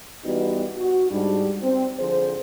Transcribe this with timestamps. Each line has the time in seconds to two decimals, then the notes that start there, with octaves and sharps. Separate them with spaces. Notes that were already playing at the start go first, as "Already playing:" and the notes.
0.25 E3 G3 B3 D#4 F#4
0.77 F#4
1.10 G#2 G3 D4
1.62 C4
1.99 D3 F3 G#4 C5